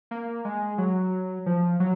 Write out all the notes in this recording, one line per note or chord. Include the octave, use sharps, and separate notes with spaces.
A#3
G#3
F#3
F3
F#3